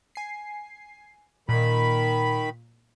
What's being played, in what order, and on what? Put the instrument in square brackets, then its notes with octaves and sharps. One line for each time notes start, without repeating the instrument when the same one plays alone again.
[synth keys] G#5 C7
[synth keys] A#2 [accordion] D#3 B5